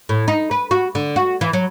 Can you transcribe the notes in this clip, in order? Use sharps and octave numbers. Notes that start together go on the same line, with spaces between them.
A2
D#4
B4
F#4
D3
F#4
E3
F#3